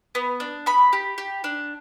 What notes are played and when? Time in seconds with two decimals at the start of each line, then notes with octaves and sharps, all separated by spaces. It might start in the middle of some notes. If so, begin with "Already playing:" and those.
0.15 B3
0.40 D4
0.66 B3 B5
0.93 G4
1.18 G4
1.44 D4